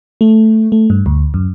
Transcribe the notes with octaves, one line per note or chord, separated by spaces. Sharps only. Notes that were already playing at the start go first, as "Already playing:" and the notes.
A3
A3
G2
D2
F#2